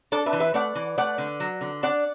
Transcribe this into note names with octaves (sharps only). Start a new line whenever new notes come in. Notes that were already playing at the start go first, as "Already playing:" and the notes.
D4 A4 D5
B4 E5
E3
B4 E5
A3 D5 F#5
E3
A3 D5 F#5
D3
F#3
D3
D4 D5 F#5